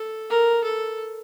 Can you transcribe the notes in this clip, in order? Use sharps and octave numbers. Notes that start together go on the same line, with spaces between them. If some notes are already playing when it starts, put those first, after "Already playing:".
Already playing: A4
A#4
A4